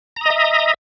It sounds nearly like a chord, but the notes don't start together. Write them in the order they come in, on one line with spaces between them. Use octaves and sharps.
A#5 D#6 D#5 E5